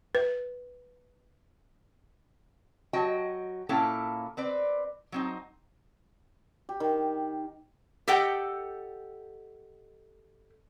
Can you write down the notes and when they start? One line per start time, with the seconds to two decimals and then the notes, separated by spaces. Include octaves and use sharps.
0.15 B4
2.93 F#3 F#4 D#5 G5
3.69 A#2 A#3 C#4 E4 A4 G5
4.37 C4 B4 D5
5.12 F#3 C4 D#4
6.69 G4
6.80 D#3
8.08 G4 A4 D#5 F#5 G5